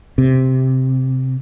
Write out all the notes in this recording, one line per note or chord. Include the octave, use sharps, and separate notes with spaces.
C3